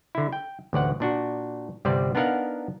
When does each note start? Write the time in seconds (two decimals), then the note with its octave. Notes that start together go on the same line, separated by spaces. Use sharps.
0.15 D3 E4
0.33 G5
0.73 A1 D2 D5 F#5
1.00 A#2 D4 F#4
1.85 G1 C3 G3 C4 D5
2.15 B3 D4 D#4 A#4 F5 F#5